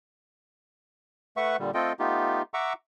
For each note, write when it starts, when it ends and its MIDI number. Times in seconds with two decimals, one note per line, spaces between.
1.37 1.56 57
1.37 1.56 71
1.37 1.56 76
1.37 1.56 78
1.37 1.56 85
1.60 1.71 46
1.60 1.71 50
1.60 1.71 55
1.74 1.92 57
1.74 1.92 60
1.74 1.92 65
1.74 1.92 69
1.74 1.92 75
1.74 1.92 79
1.99 2.42 57
1.99 2.42 59
1.99 2.42 63
1.99 2.42 65
1.99 2.42 67
2.54 2.73 76
2.54 2.73 78
2.54 2.73 82
2.54 2.73 85
2.54 2.73 86
2.54 2.73 88